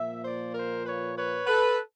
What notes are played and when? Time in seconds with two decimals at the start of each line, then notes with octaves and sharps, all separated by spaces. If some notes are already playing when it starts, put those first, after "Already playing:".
Already playing: A#2 F3 A#3 E5
0.24 C5 D5
0.55 A#4 C5
0.86 B4 C#5
1.16 B4 C#5
1.47 A4 B4